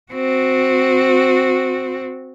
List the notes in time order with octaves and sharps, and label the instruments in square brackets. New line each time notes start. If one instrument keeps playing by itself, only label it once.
[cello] C4 F#4